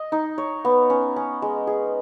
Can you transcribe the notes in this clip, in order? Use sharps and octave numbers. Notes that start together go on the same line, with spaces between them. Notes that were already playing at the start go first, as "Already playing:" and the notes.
Already playing: D#5
D#4
C#5
B3
C#4
C#4
G#3
G#4